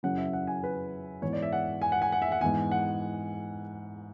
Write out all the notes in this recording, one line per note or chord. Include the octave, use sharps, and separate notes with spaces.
F#2 C#3 F#3 C#4 E4 F#5
E5
F#5
G#5
B4
G#2 E3 B3 C#5
D5
E5
F#5
G#5
F#5
G#5
F#5
E5
F#5
G#2 E3 B3 G#5
F#5